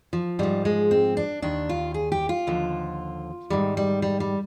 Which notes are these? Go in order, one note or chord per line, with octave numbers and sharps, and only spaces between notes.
F3
G#2 F3 G3
G#3
C4
D4
D#2 D#3 D4
F4
G#4
G4
F4
D#2 D3 F3
G#2 D#3 G3
G3
G3
G3